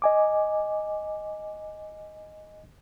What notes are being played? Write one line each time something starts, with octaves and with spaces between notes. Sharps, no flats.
D#5 G#5 D6